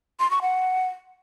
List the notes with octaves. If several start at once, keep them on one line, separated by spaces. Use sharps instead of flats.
C6
C#6
F#5